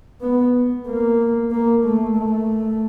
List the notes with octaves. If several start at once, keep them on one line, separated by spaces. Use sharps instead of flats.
B3
A#3
A#3
A3
A3